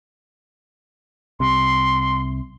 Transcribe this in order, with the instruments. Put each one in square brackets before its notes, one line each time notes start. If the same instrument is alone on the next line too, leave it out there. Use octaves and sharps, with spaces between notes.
[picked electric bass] C2 C3 [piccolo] C6